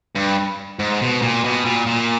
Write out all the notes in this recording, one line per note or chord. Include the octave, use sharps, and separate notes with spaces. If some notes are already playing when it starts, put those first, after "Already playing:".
G2
G#2
B2
A#2
B2
A#2
A#2